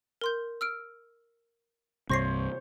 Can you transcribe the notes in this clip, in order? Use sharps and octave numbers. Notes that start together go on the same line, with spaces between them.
A#4 C6 G6
E6 F6 D7
C2 G2 C3 C5 C#5 C#6 A#6 C7